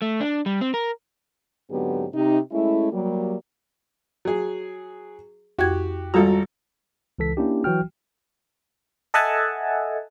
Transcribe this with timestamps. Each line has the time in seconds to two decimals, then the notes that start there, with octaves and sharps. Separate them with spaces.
0.02 A3
0.20 D4
0.46 G3
0.61 C4
0.74 A#4
1.70 G#2 D3 F#3 B3 C4 G4
2.14 C3 D#4
2.51 G#3 A3 C#4 E4
2.92 F#3 G3 A#3
4.25 F#3 G#4
5.59 F2 F#4 G4 G#6
6.14 G#1 G3 F4 F#4 A4 A#5
7.19 C#2 E3 A4 B6
7.37 A#3 C#4 D4 E4 G4
7.64 E3 F#3 F#4 G5 F6
9.14 A4 D#5 E5 F#5 G#5 A5